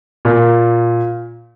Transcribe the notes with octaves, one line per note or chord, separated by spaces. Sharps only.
A#2